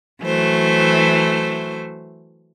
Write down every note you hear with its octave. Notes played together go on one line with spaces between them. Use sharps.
E3 F#3 A3 C5